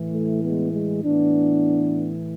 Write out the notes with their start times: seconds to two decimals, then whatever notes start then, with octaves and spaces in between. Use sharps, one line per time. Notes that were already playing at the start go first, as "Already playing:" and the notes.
Already playing: A2 E3
0.13 A3
0.43 G#3 B3
0.74 G#3
1.04 A2 E3 B3 D4